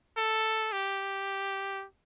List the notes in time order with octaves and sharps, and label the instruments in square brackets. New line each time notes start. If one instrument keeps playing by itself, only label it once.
[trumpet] A4
G4